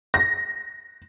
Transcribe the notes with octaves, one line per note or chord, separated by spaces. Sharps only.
A#6